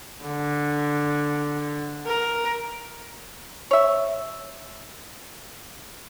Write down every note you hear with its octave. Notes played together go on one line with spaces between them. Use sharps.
D3
A#4
C#5 E5